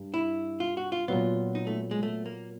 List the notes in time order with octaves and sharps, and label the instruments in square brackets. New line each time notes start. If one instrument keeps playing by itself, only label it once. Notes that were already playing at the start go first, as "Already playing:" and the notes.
Already playing: [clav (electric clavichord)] G2
[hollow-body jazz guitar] E4
F4
F#4
F4
[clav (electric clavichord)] A#2 F#3 B3 [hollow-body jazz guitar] F4
[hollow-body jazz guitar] D#4
A3
G#3
A3
A#3